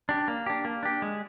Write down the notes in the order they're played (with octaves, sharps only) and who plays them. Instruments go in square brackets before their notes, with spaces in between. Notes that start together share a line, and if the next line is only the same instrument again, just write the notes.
[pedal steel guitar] D4 G4
A#3
D4 G4
A#3
D4 G4
G#3